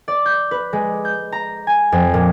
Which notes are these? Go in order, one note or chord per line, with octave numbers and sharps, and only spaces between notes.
D5
G6
B4
G#3
G6
A#5
G#5
F2
A#2